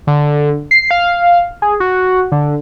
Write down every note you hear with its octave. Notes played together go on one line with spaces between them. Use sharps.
D3
C7
F5
G#4
F#4
D3